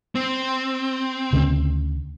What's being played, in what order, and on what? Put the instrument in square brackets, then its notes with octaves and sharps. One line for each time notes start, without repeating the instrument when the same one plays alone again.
[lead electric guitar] C4
[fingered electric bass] D2 C#3